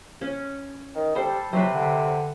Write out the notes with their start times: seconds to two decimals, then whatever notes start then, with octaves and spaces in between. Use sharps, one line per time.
0.21 C#4
0.95 D#3
1.15 G3 A4 C5
1.53 C3 F#3 B4 C5
1.74 D3